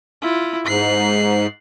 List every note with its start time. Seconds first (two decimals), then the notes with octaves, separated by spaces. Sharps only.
0.22 E4 F4
0.67 G#2 F#6 C7